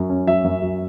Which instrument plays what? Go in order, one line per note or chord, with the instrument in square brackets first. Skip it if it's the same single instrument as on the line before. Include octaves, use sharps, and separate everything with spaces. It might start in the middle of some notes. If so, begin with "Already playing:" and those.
Already playing: [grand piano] F#2 F#3
C#4
F#3 E5
F#2
F#3